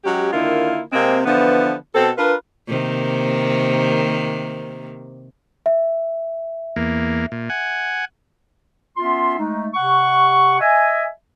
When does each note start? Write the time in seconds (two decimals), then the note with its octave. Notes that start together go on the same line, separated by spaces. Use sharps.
0.05 F#3 G#3 C#4 G4
0.33 D3 D#3 A#3 E4 F4
0.93 C3 G#3 A#3 C4
1.25 D3 E3 F3 B3 B4
1.95 B2 C4 A4
2.18 D4 F4 A#4 B4
2.68 C3 D#3 A#3
5.66 E5
6.76 E2 A#3
7.32 A#2
7.50 F#5 G#5
8.97 B3 C#4 F4 E5 C6
9.38 G#3 A3 D#4
9.74 C3 F#5 C#6
10.59 D#5 E5 G#5